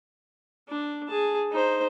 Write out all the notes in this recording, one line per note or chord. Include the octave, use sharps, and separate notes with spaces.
D4
G#4 A5
D#4 C5